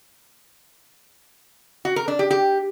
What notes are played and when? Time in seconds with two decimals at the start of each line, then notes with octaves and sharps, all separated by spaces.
1.85 F#4
1.96 A#4
2.08 D4
2.19 G4
2.31 G4